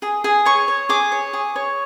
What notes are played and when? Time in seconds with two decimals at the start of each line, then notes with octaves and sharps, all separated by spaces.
0.02 G#4
0.24 G#4
0.45 C#5 C#6
0.68 C#5
0.89 G#4 D6
1.12 C#5
1.33 G#4
1.56 C#5